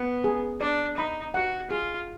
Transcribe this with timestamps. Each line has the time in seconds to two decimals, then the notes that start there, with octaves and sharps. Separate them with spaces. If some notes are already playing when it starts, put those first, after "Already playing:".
Already playing: B3 F#5
0.24 G#4
0.60 D4 D5
0.97 D#4 B5
1.34 F#4 F#5
1.70 F4 G#4